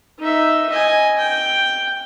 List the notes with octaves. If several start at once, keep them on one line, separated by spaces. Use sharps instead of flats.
D#4 E5
D#5 G#5
G5